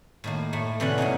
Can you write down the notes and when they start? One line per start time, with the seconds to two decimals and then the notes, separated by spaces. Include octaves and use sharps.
0.24 A2 D#3 A#3
0.53 A2 A3
0.80 C3 E3 C#4 D5 F#5
0.98 A#2 F#3 C#4 D#4